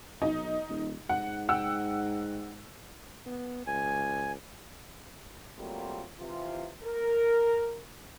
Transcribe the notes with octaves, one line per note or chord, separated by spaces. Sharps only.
B1 D#4
D#1
G#2 F#5
F#5 G5 E6
B3
C#2 G#5
F#3 G3 A3 A#3 C4 F4
C3 E3 F4
A#4